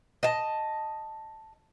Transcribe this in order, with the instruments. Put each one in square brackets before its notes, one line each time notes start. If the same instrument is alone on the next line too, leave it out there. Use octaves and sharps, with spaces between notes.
[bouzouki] D#5 A5